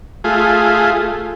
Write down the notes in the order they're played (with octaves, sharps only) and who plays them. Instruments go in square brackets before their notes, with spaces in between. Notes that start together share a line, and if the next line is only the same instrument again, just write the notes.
[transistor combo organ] A3 F4 G#4